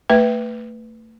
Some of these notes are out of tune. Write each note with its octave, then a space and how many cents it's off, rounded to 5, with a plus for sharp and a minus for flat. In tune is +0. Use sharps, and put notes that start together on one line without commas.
A3 +30 B4 +0 E5 +0